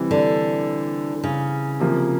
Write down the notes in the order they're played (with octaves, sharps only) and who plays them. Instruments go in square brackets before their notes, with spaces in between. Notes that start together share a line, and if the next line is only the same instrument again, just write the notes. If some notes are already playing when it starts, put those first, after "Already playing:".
Already playing: [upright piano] C3 E3 G3 C4
[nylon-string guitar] D3
C#3
[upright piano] C3 F3 A#3